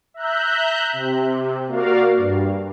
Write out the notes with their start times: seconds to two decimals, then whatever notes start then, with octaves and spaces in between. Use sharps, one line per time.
0.14 E5 A#5 F#6 G6
0.93 C3
1.67 A#3 F#4 A#4 D5 F5
2.17 G2